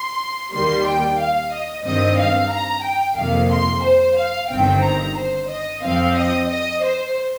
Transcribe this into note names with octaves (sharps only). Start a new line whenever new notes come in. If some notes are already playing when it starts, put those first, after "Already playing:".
Already playing: C6
D#2 D#3 G3 A#3 C6
G5
F5
D#5
G2 D#3 C4 D#5
F5
A#5
G5
F2 C3 D#3 A#3 F5
C6
C5
F5
G1 G2 D#3 C4 G5
A#5
C5
D#5
F2 F3 C4 F5
D#5
D#5
C5